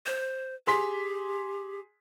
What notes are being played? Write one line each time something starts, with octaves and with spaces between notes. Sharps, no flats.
C5
G4 G#4 C6 B6